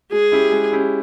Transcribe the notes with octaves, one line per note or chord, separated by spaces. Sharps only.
G#3 G#4
C#4 E4 G4
G#3
C#4 E4 G4